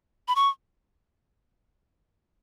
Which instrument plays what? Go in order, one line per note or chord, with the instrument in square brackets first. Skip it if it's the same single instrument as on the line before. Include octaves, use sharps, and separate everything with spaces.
[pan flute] B5
C#6